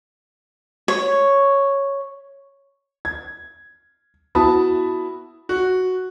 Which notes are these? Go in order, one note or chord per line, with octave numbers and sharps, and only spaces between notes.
C#5
G#6
B3 E4 F#4 A5 B5 D#6
F#4